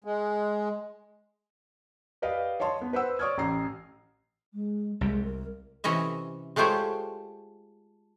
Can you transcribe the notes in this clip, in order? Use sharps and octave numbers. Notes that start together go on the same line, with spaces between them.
G#3
G4 B4 D5 D#5 F5
C#5 D#5 A5 C6
B3
B4 C5 F#5 E6
C#5 D5 C#6 D#6 F6 G#6
A1 A#5 C7
G#3
C2 C3 G#3
A#4
C3 E3 C#4 D#5 E5
G#3 A3 F4 G4 C5 C#5